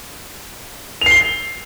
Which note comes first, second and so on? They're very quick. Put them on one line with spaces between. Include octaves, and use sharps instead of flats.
F7 C7 G7